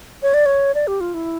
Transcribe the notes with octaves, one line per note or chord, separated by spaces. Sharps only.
C#5
D5
C#5
D5
G4
F4
E4